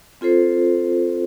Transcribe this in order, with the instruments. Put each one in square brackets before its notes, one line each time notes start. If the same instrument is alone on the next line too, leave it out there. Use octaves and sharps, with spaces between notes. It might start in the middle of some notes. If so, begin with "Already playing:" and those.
[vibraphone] C4 F4 A4 C5